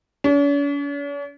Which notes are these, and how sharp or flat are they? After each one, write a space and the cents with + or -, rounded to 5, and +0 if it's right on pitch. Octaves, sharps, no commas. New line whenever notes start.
C#4 +45